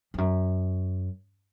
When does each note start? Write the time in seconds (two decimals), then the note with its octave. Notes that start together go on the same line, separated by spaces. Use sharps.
0.14 F2
0.18 F#2